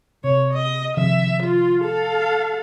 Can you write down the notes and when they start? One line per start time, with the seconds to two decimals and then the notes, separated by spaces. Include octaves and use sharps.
0.24 C3 C#5
0.53 D#5
0.97 C3 D#3 F3 E5
1.43 F4
1.81 A4 F5